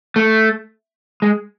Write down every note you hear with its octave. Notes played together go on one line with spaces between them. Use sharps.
A3
G#3